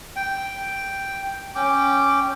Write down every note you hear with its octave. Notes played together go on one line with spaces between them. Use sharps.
G5
C#4 G5 D6